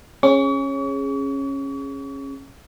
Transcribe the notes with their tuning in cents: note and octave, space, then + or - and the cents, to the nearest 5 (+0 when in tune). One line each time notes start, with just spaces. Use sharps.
C#4 -15 G#4 -5 C#6 +40